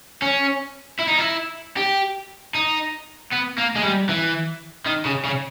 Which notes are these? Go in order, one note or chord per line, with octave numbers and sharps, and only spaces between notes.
C#4
E4
D#4
E4
G4
D#4
B3
A#3
G#3
G3
E3
D#3
C#3
C#3